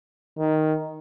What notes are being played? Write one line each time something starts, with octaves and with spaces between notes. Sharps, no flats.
D#3